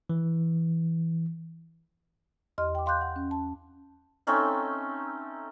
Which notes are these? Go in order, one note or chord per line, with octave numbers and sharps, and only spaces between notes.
E3
E2 G4 D#5 C6 F6
G5 D6
F5 C6 D6 F#6 G6
F#5
C#4
A5
A3 C4 C#4 D#4